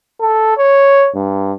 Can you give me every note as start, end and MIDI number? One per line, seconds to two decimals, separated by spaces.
0.20 0.53 69
0.57 1.09 73
1.15 1.53 43